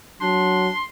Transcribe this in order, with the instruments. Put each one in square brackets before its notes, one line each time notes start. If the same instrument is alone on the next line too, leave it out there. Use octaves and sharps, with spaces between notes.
[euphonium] F#3 [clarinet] D4 [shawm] C6